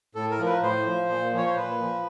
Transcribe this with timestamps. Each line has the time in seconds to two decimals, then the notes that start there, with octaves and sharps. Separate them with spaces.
0.15 A2 A4
0.31 A#4
0.39 F3
0.46 B4
0.62 A2 C5
0.86 F3
1.09 A#2
1.33 F3 C#5
1.47 C5
1.56 A#2 B4
1.80 F3